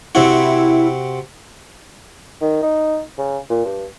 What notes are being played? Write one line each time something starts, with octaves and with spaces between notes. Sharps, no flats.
C3 C4 E4 F#4
D#3
D#4
C#3
A#2
G2